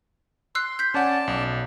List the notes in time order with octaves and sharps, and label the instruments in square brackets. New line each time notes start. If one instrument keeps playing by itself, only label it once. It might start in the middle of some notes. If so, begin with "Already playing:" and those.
[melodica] C6 [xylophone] E6 F#6 C7
[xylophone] G6 B6
[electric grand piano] C#4 F#5 G#5 [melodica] D5 A5
[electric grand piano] B1